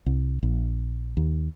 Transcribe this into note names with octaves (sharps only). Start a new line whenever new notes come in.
C2
A#1
D#2